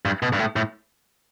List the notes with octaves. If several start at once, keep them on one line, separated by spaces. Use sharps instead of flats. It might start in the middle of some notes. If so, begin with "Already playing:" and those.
G2
B2
G2
A2
A2